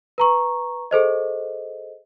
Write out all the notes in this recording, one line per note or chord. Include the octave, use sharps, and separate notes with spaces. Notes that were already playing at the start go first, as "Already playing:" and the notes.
B4 A#5 C#6
G#4 A4 C5 D#5